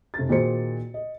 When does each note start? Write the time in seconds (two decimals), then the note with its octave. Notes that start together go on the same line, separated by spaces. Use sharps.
0.14 F1 A6
0.29 A#2 D#3 F#4 G#4 C5 C#7
0.94 D#5